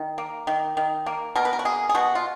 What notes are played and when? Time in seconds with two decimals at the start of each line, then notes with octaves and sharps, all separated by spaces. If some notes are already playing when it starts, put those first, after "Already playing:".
Already playing: D#3
0.18 A#3
0.47 D#3
0.77 D#3
1.06 A#3
1.35 B2 A#4
1.45 B4
1.53 A#4
1.59 F#4
1.65 A#3 G#4
1.89 G#4
1.95 B2 F#4
2.15 F4